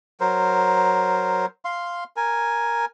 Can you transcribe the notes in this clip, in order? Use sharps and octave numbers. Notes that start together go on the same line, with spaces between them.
F#3 A#4 C5
F5 C6
A#4 G#5